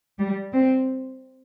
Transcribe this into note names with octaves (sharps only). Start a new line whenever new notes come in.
G3
C4